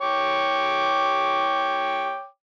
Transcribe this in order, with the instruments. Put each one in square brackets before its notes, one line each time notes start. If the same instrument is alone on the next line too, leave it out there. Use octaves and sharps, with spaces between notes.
[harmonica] C#5 G5 D6